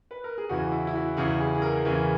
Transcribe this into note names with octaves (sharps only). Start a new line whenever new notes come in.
B4
A#4
G#4
E2 C#3 E3 F#4
E4
E4
F#4
E2 C#3 E3 G#4
G#4
G#4
A#4
E2 C#3 E3